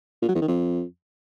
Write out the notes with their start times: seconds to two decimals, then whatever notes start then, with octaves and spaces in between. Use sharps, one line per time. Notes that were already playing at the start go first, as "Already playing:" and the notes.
0.22 A#2
0.28 F#3
0.35 E2
0.41 D#3
0.48 F2